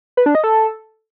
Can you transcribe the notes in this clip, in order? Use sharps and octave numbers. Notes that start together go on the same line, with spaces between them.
B4
D4
D#5
A4